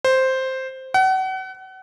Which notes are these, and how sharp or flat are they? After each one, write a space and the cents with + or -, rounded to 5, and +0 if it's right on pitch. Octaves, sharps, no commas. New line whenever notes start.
C5 +0
F#5 +35